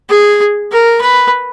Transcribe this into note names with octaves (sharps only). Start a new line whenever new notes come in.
G#4
A#4
B4